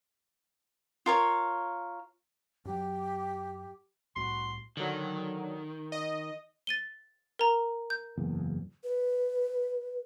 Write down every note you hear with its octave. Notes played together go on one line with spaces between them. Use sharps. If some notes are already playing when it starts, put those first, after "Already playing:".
F4 A#4 C#5
F#2 F#3 G4
C2 A2 F#4 C6
D3 D#3 F#3
D#5
A6 D#7 G7
A#4 A#5
G6
F#1 E2
B4